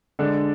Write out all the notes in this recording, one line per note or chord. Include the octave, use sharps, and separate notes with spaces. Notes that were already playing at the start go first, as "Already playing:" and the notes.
D3 G#3 D4